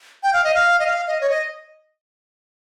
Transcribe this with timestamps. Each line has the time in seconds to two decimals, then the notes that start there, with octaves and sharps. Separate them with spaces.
0.23 G5
0.33 F5
0.44 D#5
0.54 F5
0.80 D#5
0.87 F5
1.07 D#5
1.21 C#5
1.30 D#5